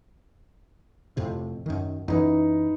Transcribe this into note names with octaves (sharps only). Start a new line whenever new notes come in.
F2 A2 C3
F#2 D#3
F#2 E3 D#4 B4